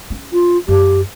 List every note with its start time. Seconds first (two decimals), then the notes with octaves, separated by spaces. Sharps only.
0.10 C#4
0.33 F4
0.68 F#2 G4